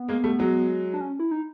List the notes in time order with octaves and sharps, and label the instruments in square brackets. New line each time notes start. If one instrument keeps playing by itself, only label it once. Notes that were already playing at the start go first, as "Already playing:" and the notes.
Already playing: [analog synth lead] B3
[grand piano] G#3 A#3
G3 A3
F#3 G#3
[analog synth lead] D4
C#4
E4
D#4